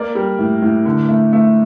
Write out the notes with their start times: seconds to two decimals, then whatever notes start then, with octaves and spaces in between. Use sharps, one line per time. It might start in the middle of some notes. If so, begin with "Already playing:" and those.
Already playing: A#3 A#4 D5
0.15 G3
0.39 A2
0.62 A2
0.86 D3
1.09 A3
1.33 A3